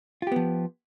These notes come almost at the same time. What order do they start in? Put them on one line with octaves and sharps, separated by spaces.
F4 G4 B3 F3